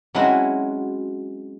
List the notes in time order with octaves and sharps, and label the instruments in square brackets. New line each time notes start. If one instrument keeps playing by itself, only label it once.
[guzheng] F#3 G#3 C4 C#4 E4 F#4